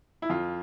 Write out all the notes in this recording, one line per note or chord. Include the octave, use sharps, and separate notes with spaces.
E4
F2 F4